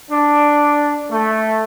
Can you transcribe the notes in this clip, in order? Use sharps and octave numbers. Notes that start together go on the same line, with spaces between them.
D4
A3